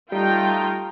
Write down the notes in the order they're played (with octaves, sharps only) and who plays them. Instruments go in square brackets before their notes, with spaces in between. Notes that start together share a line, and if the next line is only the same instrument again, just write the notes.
[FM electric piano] G3 [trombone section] A3 D#4 [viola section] F4 G5